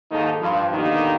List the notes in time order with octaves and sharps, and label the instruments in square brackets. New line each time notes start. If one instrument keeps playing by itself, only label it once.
[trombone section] D#2 G#2 D#3 A#3 D#4 A4
G2 F3
B2 D3 D#3 A#3 D#4 G4